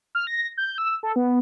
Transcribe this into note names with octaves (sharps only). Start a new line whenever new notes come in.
F6
A#6
G6
E6
A4
B3